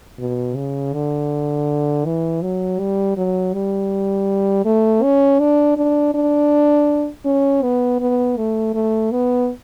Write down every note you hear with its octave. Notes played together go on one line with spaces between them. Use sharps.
B2
C#3
D3
E3
F#3
G3
F#3
G3
A3
C#4
D4
D4
D4
C#4
B3
B3
A3
A3
B3